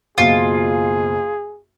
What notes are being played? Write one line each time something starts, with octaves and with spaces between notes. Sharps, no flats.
F#1 B1 F4 G#4